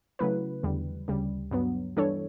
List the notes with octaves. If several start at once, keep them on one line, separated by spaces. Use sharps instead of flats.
C#3 F#3 A3 E4 B4
E2 D3 G3
D2 C#3 G3
G2 F#3 B3
E3 G3 D4 A4 C#5